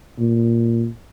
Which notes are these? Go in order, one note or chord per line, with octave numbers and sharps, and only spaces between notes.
A#2